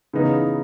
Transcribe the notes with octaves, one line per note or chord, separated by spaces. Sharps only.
C#3 E3 B3 D#4